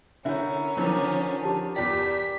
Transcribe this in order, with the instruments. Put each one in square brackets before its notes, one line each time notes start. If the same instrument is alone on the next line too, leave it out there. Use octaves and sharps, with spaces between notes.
[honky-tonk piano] D3 E4 [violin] C#4 [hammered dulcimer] A#4 [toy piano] C#5 E5
[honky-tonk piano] D3 D#3 F3 [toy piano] D#4 E4 A#4 [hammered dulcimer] D5 A#5
[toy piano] G4 A5
[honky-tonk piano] E2 D5 [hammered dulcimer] G2 G3 D6 [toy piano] F4 G5 [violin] B6